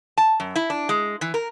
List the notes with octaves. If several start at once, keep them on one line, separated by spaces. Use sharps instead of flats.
A5
F#2
E4
D4
G#3
E3
A#4